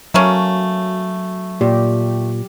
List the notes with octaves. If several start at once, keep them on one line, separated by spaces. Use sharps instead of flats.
F#3 A3 A#3 C#4
A#2 G4